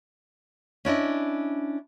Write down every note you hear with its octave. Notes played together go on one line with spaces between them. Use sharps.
C#4 D4 E4 D#5